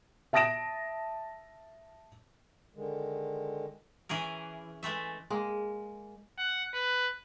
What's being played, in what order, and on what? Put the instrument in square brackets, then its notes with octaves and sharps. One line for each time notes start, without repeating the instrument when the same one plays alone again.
[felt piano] E5 A5 D#6 A#6 D7 E7
[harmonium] D3 D#3 G#3
[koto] E3 C#4 G#4 A#4
E3 G#3 A3 E5
[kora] G#3 A#3
[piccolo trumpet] F#5
B4